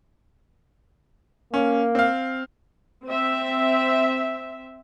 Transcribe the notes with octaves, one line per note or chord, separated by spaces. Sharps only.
A#3 C#4
C4 F5
C4 E5